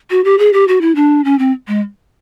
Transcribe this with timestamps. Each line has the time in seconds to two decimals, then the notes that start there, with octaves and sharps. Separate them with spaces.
0.10 F#4
0.24 G4
0.39 G#4
0.53 G4
0.68 F#4
0.81 E4
0.95 D4
1.25 C#4
1.39 C4
1.68 G#3